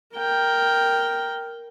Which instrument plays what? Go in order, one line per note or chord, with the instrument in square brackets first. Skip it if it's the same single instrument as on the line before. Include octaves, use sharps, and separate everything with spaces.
[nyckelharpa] A#4 G5